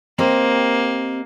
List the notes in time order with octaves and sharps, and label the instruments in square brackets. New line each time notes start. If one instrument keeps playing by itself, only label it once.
[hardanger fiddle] A#3 [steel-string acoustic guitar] C4 G4 D#5